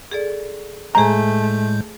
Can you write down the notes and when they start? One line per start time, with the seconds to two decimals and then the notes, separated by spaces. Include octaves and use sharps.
0.12 G#4 A4 D5
0.95 A2 G#3 A3 G#4 C5 G#5 A#5 G6